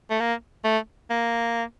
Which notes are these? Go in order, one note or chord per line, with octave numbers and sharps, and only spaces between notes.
A3
A#3
A3
A#3